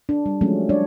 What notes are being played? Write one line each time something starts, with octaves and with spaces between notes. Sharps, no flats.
D4
G3
F3 F#3 G#3 A3 C#4
G3 D4 C#5 D5